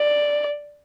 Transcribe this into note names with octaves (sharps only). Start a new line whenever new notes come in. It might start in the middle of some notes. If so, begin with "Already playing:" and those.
Already playing: D5